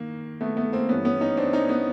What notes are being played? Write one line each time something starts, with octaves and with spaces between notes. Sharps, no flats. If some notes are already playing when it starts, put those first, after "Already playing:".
Already playing: D#3 A#3
A3 B3
A3 B3
A#3 C4
G2 E3 B3 C#4
B3 C#4
C#4 D#4
C4 D4
C#4 D#4
B3 C#4